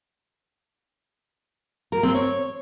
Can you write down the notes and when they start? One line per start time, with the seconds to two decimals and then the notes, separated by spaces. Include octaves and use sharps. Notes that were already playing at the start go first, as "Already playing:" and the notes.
1.92 A#4
2.03 C4
2.14 C#5